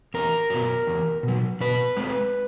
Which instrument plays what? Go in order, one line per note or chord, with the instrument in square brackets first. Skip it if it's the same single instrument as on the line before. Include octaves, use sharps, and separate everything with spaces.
[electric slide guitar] E2 A#4
B2 F#3
E2
B2 F#3
B2 B4
G#3 C4